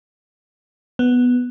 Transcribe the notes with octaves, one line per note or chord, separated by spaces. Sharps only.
B3